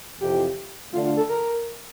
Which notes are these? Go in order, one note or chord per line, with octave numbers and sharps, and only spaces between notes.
F2 C3 E3 G4
D3 A3 D4 F4
F4
A4
A#4